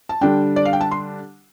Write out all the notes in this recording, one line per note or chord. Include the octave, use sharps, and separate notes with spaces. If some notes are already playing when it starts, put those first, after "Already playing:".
A5
D3 G3 D4 G5
D5
F5
G5
A5
C6